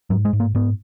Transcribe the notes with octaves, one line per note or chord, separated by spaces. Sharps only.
G#2 F#3
G#3
G#2
A#3
G#2 B3